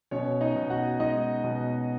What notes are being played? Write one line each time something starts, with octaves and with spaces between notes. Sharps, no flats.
B2 C#4 C#5
D#4 D#5
B2
F#4 F#5
G#3 D#4 D#5
B2